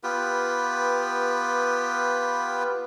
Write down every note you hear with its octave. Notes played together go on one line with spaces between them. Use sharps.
B3 F4 G4 B4